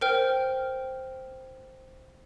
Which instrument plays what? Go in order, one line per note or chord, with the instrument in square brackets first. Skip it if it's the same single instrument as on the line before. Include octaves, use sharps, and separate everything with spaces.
[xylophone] A#4 C5 G5 F6